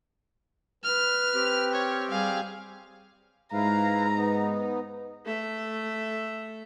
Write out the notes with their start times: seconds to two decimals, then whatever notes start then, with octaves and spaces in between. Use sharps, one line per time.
0.84 B4 F6
1.34 C4 G4
1.74 C#5
2.11 G3 G#4 F5
3.53 G#2 E4 B4 F5 A#5
4.14 B3 D#4
5.25 A3 E5